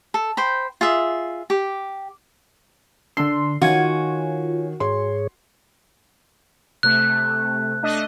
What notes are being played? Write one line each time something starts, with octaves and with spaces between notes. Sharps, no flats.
A4
C5 G5 B5
F4 G#4 E5
G4
D3 D4 C6 E6
D#3 F4 F#4 C#5 G#5
G#2 G#4 C#5 C6
C3 A3 F#6
A3 D4 D#5